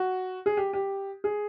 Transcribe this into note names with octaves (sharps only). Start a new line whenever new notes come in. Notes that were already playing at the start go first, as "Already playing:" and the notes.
Already playing: F#4
G#4
G4
G4
G#4